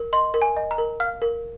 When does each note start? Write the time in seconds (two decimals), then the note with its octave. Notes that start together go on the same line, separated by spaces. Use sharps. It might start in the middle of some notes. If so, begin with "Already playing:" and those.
Already playing: A#4
0.13 D#5 C6
0.34 A#4
0.42 G#5
0.57 D#5
0.71 A#5
0.78 A#4
1.00 F5 F6
1.22 A#4